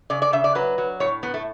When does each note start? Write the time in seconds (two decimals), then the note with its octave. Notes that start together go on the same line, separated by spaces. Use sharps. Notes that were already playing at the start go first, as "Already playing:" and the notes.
0.10 C#3 D5
0.22 D5
0.33 C#3 E5
0.44 D5
0.55 F#3 B4
0.78 F#3
1.00 A2 C#5
1.23 A2 B3
1.34 A3